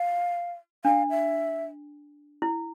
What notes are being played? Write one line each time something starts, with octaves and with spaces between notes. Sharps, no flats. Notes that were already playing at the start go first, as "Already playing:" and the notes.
Already playing: F5
D4 F5
E5
E4